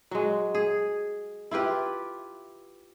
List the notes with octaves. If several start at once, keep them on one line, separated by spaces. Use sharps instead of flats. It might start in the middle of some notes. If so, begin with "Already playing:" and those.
F#3 G#3
G#4
E4 F4 G4 B4